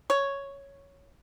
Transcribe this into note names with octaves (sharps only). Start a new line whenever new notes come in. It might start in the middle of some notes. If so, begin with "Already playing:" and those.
C#5